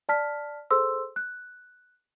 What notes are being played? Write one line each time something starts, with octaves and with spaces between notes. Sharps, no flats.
D5 A5 F6 B6
G#4 A4 C5 C6 E6
F#6